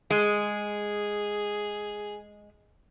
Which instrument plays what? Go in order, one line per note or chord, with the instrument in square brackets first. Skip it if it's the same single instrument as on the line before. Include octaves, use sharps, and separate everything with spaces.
[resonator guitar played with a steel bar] G#3 [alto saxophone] G#4